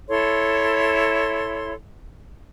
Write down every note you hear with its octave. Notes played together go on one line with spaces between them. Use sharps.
E4 A4 C#5 C6